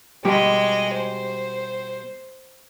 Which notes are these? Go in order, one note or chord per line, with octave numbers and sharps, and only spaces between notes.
B2 G3 G#3 G4 D#5
C5